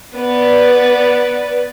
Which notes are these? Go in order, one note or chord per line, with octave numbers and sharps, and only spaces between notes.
B3 B4 D5